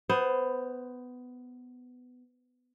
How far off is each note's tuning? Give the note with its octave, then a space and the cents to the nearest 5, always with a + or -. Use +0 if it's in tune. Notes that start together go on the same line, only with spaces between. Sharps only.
B3 +15 C5 +0